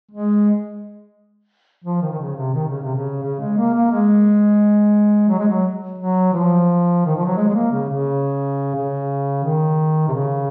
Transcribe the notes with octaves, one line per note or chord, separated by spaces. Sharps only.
G#3
F3
D#3
D#3
C#3
C3
D#3
C#3
C3
C#3
C#3
G#3
A#3
A#3
G#3
F#3
G#3
F#3
F#3
F3
D#3
F3
F#3
G#3
G#3
A#3
C#3
C#3
C#3
D#3
C3
C#3